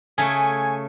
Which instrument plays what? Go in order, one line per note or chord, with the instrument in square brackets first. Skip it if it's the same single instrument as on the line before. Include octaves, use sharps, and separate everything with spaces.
[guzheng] C#3 A3 [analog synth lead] G#5